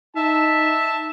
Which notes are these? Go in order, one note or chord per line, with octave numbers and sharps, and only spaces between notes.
D#4 E5 A5